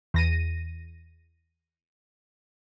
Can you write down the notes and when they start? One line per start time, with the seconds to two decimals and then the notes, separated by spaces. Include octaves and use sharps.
0.14 E2 A#6 D#7